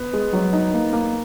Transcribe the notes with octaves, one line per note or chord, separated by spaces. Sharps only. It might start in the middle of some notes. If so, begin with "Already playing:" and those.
Already playing: B3
G#3
F#3
D#4
A#3
A#3